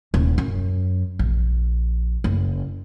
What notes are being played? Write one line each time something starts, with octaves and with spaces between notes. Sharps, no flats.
D#1
F#2
A#1
F#1